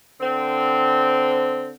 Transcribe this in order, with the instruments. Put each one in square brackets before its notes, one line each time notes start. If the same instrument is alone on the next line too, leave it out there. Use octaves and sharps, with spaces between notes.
[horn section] D3 C4